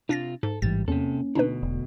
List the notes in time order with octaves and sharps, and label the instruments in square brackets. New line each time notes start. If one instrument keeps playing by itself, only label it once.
[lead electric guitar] C3 F4 [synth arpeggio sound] D4 A6 A#6
[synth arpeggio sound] G#2 [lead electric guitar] A4
[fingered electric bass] A1 G#2 E3 [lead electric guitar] G3 [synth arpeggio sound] A6
[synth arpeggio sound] E2 [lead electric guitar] C3 A4 [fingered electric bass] A#3 C#4
[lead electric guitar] D2 B2 [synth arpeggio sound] D4 D#4 B4
[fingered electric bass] E1